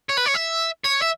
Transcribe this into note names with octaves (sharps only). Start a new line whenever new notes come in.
C#5
B4
C#5
E5
C#5
E5